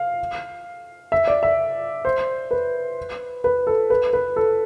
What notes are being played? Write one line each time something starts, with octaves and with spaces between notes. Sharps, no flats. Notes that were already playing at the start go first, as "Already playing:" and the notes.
Already playing: F5
E5
D5
E5
C5
B4
B4
A4
B4
B4
A4